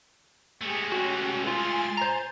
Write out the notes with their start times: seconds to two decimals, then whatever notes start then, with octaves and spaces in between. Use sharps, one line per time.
0.61 G#3 A3 G4 G#4
0.92 C#4 F#4 G4
1.47 F4 G#5 C6 A6
1.97 C5 A#5